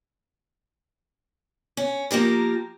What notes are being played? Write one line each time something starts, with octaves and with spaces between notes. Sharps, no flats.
C#4
F3 A#3 G4 A#4